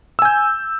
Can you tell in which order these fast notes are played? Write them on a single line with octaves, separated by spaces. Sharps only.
E6 G#5 G6